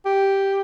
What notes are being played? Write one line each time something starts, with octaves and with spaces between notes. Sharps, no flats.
G4